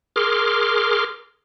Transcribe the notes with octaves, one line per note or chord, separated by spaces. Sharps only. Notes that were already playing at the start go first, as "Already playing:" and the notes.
G#4 A#4 C6 D6 F6